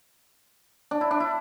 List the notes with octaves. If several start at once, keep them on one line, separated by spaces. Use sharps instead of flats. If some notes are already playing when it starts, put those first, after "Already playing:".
D4
E4
D4
E4